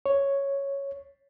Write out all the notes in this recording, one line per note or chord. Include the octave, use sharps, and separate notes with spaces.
C#5